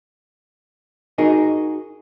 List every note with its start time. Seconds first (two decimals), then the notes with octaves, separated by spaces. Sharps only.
1.18 D#4 F#4 G#4 A#4 D#5